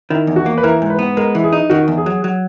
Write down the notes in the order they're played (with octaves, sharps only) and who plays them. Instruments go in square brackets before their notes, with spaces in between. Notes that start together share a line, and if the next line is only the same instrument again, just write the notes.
[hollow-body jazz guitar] D#3 [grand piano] E4
[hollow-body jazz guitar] E2
[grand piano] F#4
[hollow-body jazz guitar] A#3
[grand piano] B4
[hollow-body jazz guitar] E3 [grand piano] A#4
[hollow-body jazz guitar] G#2
[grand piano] B4
[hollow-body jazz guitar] B3
[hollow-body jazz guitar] G#3 [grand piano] A#4
[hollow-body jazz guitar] E3
[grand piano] G#4
[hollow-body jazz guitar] D#4
[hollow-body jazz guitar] D#3 [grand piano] F#4
[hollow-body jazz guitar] E2
[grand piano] G#4
[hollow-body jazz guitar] F#3
F#3